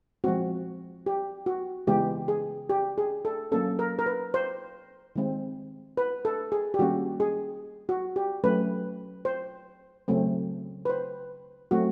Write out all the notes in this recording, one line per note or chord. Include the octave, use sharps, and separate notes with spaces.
F3 G#3 C4 F#4
G4
F#4
C#3 E3 G#3 B3 G4
G#4
G4
G#4
A4
F#3 A#3 C#4 A4
A#4
A#4
B4
C5
D#3 G#3 C4
B4
A4
G#4
G4
D#3 G3 A#3 C#4 F#4
G#4
F#4
G4
F#3 A3 C#4 B4
C5
C#3 F#3 A3 C4
B4
C5
F#3 A3 C4 F#4